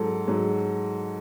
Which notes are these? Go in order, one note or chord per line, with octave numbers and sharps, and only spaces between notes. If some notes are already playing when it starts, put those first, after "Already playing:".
Already playing: G#2 F#3 A4
G#2 F#3